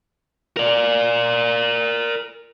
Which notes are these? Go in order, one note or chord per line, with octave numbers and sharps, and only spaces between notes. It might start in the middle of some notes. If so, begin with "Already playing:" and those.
A#4 D5